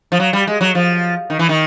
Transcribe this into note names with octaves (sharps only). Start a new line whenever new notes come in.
F3
F#3
G3
G#3
F#3
F3
D#3
E3
D#3